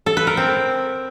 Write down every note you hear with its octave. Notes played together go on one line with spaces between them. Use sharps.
A4
B4
A#4
C4